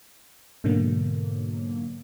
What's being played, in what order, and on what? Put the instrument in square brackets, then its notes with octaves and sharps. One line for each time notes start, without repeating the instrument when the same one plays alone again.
[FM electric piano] G#2 B2 D3 F#3 A#3